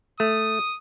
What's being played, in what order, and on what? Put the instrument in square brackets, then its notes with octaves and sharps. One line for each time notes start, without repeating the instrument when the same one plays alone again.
[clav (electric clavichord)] A3 [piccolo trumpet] D#6